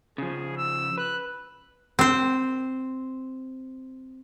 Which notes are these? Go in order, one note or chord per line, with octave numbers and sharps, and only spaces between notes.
C#3 F3 G#4
E6
B4 F#6
C4 C5